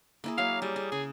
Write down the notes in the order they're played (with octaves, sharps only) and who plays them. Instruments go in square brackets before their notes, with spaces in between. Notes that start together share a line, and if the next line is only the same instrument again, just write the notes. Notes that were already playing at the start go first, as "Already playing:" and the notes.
[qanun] A#3 E4 G#4
[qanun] F#3 A#3 [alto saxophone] F5
[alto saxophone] G3 [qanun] G#4
[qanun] G#4
[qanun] C#3 [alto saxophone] G#4